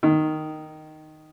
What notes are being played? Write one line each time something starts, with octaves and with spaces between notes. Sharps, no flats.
D#3